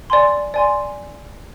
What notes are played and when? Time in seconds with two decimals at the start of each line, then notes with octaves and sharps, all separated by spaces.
0.10 D5 G#5 C6
0.54 D5 G#5 C6